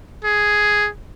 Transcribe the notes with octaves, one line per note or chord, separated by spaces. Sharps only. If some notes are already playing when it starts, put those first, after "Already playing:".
G#4